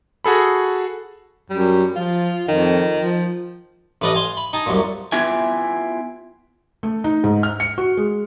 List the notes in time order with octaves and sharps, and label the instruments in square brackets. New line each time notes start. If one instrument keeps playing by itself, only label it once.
[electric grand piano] F#4 G#4 A4 B5
[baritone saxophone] F#2 [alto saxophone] G3
[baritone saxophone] F3 [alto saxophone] F4
[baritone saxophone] F2 [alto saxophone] D#3
[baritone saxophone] F3
[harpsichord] A1 A2 B4 D5 D#5
F5 G#5 C6
B5
D#4 G#5 A5
C2 F#2 A#2
[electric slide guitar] B3 E4 F4 G4 E5 G#5
[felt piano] A3
D#4
G#2
F6
C#7
F#4
G#3